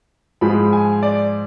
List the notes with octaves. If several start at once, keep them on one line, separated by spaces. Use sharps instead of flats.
G#2 F3 G#3 B5
G#5
D5